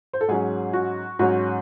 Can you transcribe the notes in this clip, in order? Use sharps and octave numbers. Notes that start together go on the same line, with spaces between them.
C5
A4
G#2 F#3 C#4 G#4
F#4
G#2 F#3 C#4 F#4